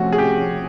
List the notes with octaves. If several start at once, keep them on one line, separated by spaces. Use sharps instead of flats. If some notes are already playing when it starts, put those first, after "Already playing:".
Already playing: C3 F3 A3 C#4 F#4
G#4
G4